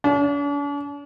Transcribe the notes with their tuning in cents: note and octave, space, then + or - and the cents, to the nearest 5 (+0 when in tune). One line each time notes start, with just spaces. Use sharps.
D4 -45